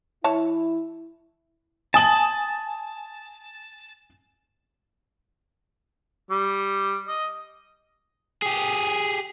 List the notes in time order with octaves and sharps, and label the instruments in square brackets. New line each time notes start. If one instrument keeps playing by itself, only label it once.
[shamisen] E3 C#5 A5 [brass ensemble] E4
[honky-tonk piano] G#5 D#6 F#7 [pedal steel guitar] A5
[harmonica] G3
D#5
[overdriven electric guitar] G4 G#4